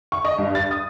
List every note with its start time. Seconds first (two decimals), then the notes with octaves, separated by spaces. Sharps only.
0.12 C#6
0.25 D#5
0.38 G2
0.55 A6
0.71 D#6